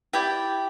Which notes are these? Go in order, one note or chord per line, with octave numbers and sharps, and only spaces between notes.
E4 G4 D5 G5